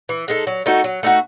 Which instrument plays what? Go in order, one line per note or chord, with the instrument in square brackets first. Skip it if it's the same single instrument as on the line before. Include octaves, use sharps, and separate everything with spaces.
[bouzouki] E3
G#3 D#4 A4
F#3
A3 D#4 F#4
F#3
A3 D#4 F#4